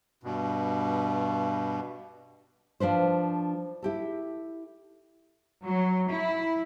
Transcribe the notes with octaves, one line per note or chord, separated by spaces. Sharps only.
G2 B2
F3 D4 B4 C5
E4 G4 A4
F#3
E4